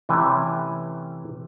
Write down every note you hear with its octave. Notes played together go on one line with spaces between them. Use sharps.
C3 E3 A3 C#4 G5 G#5